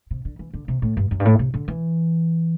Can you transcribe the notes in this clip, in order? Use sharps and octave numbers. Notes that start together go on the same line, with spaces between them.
C3
D3
E3
D3
C3
A2
G2
F#2
G2
A2
C3
D3
E3